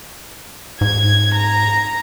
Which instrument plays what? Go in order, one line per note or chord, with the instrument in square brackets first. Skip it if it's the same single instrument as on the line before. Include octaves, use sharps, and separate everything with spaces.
[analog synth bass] G#2 [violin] G#6
[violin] A#5